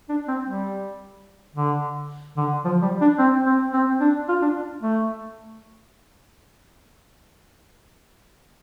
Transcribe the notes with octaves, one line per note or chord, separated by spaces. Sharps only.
D4
C4
G3
D3
D3
F3
G3
D4
C4
C4
C4
D4
F4
D4
A3